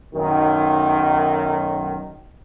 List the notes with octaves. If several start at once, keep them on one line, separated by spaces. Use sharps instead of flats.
B1 F#2 D#3